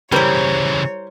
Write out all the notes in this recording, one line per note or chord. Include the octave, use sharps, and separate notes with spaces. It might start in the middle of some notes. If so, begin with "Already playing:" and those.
C#3 E3 G3 E4 A#4 C5 C#5